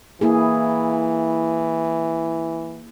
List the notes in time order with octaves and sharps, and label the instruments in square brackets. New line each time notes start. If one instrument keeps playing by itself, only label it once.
[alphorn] E3 [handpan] A#3 E4 G#4